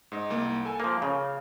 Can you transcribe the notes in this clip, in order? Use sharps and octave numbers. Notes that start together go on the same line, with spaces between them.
G#2 D#5
C2 A#3
A4 G#5
F3 A#3 F6
C#3